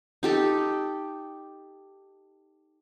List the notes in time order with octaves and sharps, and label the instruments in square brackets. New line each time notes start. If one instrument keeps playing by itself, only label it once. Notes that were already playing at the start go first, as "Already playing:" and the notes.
[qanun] D#4 G4 A4